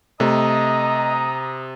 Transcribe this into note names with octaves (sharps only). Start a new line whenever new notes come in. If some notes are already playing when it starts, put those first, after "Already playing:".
C3 A3 D#5 A#5 D#6